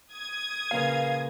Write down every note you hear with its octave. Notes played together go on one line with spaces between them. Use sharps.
D#6 G#6
A#2 C#3 F3 A#4 B4 F5